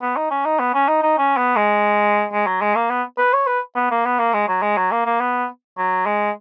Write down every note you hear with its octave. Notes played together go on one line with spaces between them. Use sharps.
B3
D#4
C#4
D#4
B3
C#4
D#4
D#4
C#4
B3
G#3
G#3
F#3
G#3
A#3
B3
B4
C#5
B4
B3
A#3
B3
A#3
G#3
F#3
G#3
F#3
A#3
A#3
B3
F#3
G#3